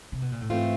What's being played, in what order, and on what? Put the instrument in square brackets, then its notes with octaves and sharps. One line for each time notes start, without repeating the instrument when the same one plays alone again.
[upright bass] C3
B2
A#2
A2
[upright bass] G#2 [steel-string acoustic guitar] E3 A3 C4 F4